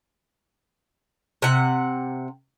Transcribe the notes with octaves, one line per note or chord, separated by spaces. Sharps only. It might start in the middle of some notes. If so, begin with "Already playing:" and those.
C3 F#5